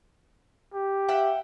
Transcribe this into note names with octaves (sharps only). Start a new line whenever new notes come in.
G4
E5 F#5 G5